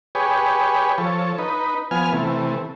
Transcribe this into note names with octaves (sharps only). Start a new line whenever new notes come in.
G4 G#4 B4 C#5
F3 A4 C#5
D#4 B4
F3 B3 G#5 F6
C3 E3 A3